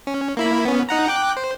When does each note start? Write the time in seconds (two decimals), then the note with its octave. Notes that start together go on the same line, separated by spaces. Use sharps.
0.07 C#4
0.37 A#3 E4 B5
0.65 B3 C#4
0.89 D#4 F#5 A#5
1.08 G5 D6 F#6
1.37 C5